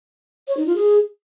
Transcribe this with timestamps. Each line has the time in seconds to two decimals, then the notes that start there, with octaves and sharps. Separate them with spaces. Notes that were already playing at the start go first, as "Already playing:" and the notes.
0.48 C#5
0.57 D#4
0.66 F4
0.76 G#4